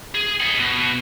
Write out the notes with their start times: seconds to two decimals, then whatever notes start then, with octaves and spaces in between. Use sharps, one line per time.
0.15 G#4
0.40 D#5 F#5
0.60 B2